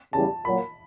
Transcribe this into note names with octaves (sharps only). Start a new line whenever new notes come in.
E2 C#3 E3 G3 A5
A#2 F#3 A#3 B5